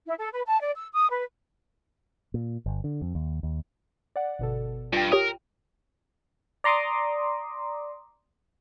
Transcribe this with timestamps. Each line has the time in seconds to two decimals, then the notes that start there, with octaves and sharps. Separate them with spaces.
0.06 E4
0.18 A4
0.33 B4
0.45 A5
0.61 D5
0.76 E6
0.93 D#6
1.10 B4
2.34 A#2
2.66 G1
2.84 D3
3.01 F2
3.15 D#2
3.43 D#2
4.16 D5 F#5
4.39 G1 B2 A4
4.93 G2 F4 G5
5.12 G4 A#4 C#5 D#6
6.64 D5 A#5 C6 D6 D#6